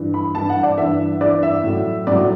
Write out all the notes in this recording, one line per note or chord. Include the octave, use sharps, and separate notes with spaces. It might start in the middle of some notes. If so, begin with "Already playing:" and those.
Already playing: G2 E3
B5
G2 E3 A5
F#5
D5
G2 E3 E5
G2 E3 D5
E5
A2 F#3
A2 F#3 D5